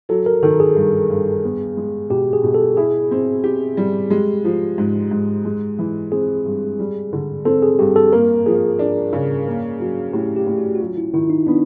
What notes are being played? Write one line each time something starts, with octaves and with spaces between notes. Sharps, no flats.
F#3 A4
A#4
D#3 A4
G#4
G2
G2
B3
G#3
B2 G4
G#4
B2
A4
E4 G#4
C4
G4
G3
G#3 G4
F3
G#2
G#2
G#3
E3
C4 G#4
G2
G3
D3
C4 A4
G#4
G2 G4
A4
A#3 A#4
F3 G#4
D4
C#3
A#3
F#3
A2 G4
G4
A2
F#4
F#4
F#3 F4
E4
D#3 E4
D#4
B3 D4